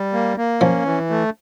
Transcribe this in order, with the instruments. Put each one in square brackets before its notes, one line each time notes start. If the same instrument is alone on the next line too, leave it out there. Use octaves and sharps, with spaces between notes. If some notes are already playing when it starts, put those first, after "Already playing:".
Already playing: [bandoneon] G3
A#3
A#3
[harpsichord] F3 [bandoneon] C#4
[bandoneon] E3
A3